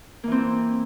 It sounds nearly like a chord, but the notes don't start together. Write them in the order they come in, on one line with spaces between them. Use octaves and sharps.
A#3 E3 C4